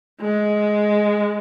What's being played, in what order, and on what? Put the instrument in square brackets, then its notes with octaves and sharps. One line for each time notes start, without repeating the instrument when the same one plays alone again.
[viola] G#3